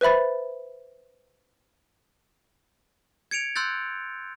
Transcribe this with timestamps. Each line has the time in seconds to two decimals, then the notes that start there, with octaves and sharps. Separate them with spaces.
0.01 B4 C5 E5 B5 A6
3.31 G#6 C#7 D7 F7
3.56 C6 E6 F#6 G6 A6